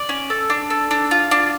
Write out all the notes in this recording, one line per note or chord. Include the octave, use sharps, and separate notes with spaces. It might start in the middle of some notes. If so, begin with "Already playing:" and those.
Already playing: D5
C#4
A4
D4
A4
D4
F4
D4